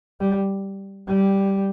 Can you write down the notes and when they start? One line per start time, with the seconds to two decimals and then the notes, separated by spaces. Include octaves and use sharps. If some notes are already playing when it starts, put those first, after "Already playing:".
0.20 G3
1.08 G3